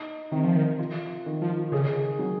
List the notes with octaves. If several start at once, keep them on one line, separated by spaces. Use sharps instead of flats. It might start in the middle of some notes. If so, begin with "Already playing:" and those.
Already playing: D#4
C3 D#3
F3
D#3
F4
D#3
F3
C#3 G#4
F#3